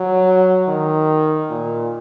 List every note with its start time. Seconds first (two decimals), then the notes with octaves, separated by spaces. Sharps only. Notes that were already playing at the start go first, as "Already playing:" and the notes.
Already playing: F#3
0.68 D#3
1.50 A#2